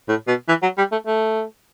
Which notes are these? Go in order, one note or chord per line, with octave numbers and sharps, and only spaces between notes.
A2
B2
E3
F#3
G3
A3
A3